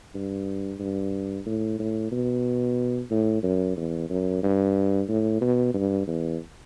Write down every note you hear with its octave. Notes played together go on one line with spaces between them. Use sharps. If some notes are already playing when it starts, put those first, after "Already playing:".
G2
G2
A2
A2
B2
A2
F#2
E2
F#2
G2
A2
B2
G2
E2